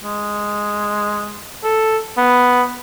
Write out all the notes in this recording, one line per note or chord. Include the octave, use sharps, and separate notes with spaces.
G#3
A4
B3